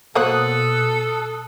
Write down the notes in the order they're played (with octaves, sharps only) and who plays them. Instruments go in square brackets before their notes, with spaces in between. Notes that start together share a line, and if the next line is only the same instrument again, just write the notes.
[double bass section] B2 [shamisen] F#3 A#3 C5 [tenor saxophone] A4 [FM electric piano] D#6 F#6